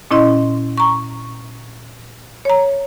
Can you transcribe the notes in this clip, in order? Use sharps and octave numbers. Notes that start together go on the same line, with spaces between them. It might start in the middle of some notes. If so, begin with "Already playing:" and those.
A#2 C#4 E4 D#5 C6
A#5 C#6
C#5 A#5